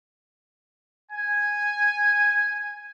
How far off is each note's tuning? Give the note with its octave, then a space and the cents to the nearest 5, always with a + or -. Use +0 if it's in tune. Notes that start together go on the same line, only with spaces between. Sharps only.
G#5 -5